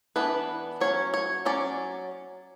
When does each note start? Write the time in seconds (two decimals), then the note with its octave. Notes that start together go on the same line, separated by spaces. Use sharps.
0.16 E3 B3 D4 B4
0.81 F#3 C#4 C#5
1.14 C#5
1.45 F#3 C#4 D5